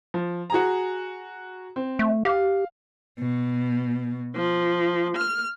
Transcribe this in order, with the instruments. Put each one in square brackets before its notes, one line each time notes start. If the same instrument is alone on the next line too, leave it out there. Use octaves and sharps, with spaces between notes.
[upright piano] F3
F#4 G#4 A#5
C4
[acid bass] A3
[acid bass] G4 [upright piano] F5
[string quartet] B2
F3
F6